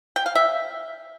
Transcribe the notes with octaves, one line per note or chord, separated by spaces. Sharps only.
G5
F5
E5